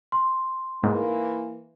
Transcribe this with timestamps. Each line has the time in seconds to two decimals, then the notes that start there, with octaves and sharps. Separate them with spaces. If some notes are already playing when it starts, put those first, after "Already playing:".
0.12 C6
0.84 G#2 E3 A#3